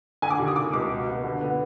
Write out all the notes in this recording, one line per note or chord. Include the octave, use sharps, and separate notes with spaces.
D3 G#5
D6
D#2
D#6
C3 D6
C#2 D6
B2
B3
D3
B3